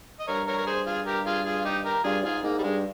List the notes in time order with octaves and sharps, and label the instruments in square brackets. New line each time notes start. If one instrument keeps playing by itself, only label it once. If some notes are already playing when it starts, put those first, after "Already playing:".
[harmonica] D#5
[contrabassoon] G2 [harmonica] A#4 C#5
[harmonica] A#4 C#5
A#4
G#4 C5
F4 G#4
G4 A#4
F4 G#4
F4 G#4
D#4 G4
G4 A#4
[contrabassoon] G2 [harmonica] F4 G#4
[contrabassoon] G#2 [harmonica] F4 G#4
[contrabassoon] G#2 [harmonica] A#3
[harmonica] G3
[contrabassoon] G2 [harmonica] G#3